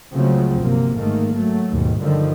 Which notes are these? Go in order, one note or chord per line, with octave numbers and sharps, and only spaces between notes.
C#2 C#3 F3 F#3 A3 C4
G1 C3 A#3
G#2 D#3 A3 A#3
F#3 A3
D#2 G#2 B2
G2 D3 D#3 F3